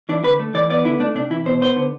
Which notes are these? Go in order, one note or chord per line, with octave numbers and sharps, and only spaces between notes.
E3 D4
D3 B4
A3
E3 D5
B3 D5
D3 E4
A3 D4
C3 D4
E3 E4
B2 C5
B3 C5
D3